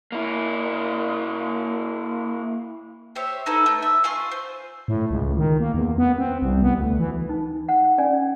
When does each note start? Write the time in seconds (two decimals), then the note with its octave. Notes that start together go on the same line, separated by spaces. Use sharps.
0.12 A#3 E4
3.15 G4 C5 C#5 E5
3.46 D#4 E4 A4 B4
3.66 A3
3.82 E5
4.04 F4 G#5 C6 C#6
4.31 C5
4.88 A2
5.11 C#2
5.38 D#3
5.60 A#3
5.74 E2
5.98 B3
6.18 C4
6.42 C2
6.62 B3
6.76 D2
6.99 E3
7.29 D#4
7.69 F#5
7.98 C#4 D5 G#5